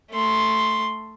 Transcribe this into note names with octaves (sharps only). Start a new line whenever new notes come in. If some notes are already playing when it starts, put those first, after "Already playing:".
A3 C6